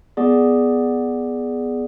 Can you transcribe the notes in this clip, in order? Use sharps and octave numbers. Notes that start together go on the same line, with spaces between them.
B3 G#4 D5